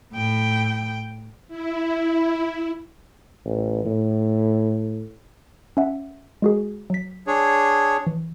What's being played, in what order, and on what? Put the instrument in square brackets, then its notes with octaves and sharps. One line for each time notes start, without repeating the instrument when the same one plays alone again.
[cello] A2 G5
[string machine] E4
[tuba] A1
A2
[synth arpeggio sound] C#4 E5 F#5
G#3 F#4 G#4
F#3 B6
[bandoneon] D4 G#4 C#5
[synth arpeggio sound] E3